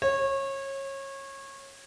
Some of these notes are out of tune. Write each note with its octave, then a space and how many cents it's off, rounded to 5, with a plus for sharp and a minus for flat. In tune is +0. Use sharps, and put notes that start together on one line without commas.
C#5 -25